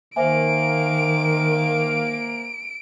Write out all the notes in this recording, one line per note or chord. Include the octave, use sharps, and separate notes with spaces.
D#3 A#3 C5 E5 G#5 D7